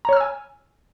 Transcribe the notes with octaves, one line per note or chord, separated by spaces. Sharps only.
C#5 G#5 A#5 E6 F6